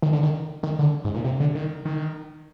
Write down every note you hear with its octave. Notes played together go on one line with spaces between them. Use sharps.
D#3
D3
D#3
D#3
D3
G#2
A#2
C3
D3
D#3
D#3